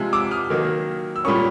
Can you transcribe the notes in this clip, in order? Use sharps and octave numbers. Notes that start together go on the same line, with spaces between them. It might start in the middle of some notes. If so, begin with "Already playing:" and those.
Already playing: C3 F3 G#3
D6 E6
D#6 F6
D#3 F#3 A#3
E6
A#2 G3 A#3 C#4 C#6 D#6